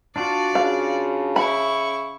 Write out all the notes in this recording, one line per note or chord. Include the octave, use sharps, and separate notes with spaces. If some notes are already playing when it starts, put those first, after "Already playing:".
D4 F4 F#4 D5
C#3 F5
E4 B5 C#6